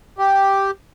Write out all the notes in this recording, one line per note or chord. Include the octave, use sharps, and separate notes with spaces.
G4